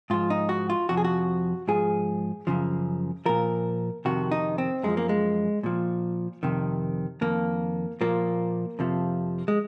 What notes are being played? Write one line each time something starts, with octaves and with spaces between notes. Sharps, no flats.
G#2 F3 F4
D#4
F#4
F4
F2 C3 F3 F#4
G#4
F#4
G#2 F3 G#4
F#2 C#3 F3
A#2 F3 A#4
F2 C3 D#3 F#4
D#4
C4
F#2 F3 G#3
A#3
G#3
A#2 F3
F2 C3 D#3
F2 D#3 A#3
A#2 F3 A#3
F2 C3 F3
G#3